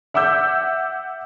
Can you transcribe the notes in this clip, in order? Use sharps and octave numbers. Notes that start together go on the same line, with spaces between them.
E5 F#5 D6 E6 G6